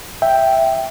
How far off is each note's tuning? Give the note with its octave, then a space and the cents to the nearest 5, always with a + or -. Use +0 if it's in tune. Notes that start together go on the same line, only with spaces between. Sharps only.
E5 +0 G5 +0